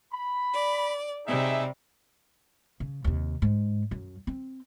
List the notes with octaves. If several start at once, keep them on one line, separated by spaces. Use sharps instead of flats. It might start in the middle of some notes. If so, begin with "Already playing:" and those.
B5
D5
C3 G3 D#4 G#4 E5
C#3
D#2 C3
G#2
F#2
C4